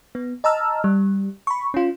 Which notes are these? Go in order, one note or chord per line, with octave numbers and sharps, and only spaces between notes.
B3
D#5 A5 A#5 E6 F6
G3
B5 C#6
C#4 F4